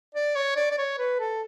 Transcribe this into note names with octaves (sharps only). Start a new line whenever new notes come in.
D5
C#5
D5
D5
C#5
B4
A4